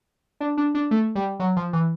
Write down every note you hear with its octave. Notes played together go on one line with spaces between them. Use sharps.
D4
D4
D4
A3
G3
F#3
F3
E3